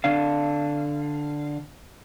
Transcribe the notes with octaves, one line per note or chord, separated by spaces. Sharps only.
D3 D4 F5